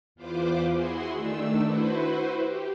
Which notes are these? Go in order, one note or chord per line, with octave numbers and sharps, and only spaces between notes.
E2 F4 B4 C5 D6
E4 F#4 G#4 C6
D#3 A3 D4 E6
E4 F#4 B4 C5
G4